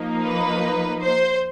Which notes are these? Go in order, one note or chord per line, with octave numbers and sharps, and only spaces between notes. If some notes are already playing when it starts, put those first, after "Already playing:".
Already playing: F3 A#3 D#4
B4
C5